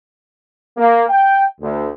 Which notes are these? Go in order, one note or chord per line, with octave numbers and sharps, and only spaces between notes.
A#3
G5
D2